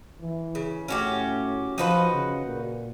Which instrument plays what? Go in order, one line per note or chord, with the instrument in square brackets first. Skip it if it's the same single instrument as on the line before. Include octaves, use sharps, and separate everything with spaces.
[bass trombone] E3
[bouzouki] C#3
[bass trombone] A2 [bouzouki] C#4 F#4 G4
[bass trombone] F3 [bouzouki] D#4 F#4 B4
[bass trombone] C#3
A#2